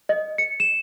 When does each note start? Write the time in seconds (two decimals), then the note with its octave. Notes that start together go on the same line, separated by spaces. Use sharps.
0.09 D#5
0.38 C#7
0.60 E7